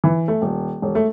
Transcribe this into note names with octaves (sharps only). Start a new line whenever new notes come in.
E3
A3
D#1
E1
A3